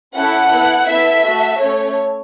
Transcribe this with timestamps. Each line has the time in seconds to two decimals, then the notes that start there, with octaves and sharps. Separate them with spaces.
0.15 C#4 E4 A4 F#5
0.52 B3 E4 A4
0.88 B3 E4 A4 E5
1.24 A3 F#4 A4
1.59 A3 C#4 A4 C#5